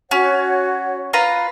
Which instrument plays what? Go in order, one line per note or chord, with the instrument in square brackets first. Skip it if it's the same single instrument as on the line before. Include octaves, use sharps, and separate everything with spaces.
[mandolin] C#4 [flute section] F#4 C#5 F#5
[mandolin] F4 B4 A#5